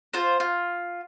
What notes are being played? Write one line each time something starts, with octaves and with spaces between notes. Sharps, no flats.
F4 C5
F4